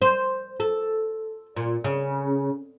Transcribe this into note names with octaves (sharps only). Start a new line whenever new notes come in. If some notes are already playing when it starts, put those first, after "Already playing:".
C5
A4
A#2
C#3